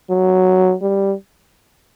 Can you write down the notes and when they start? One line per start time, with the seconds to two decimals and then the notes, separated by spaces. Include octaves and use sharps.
0.10 F#3
0.82 G3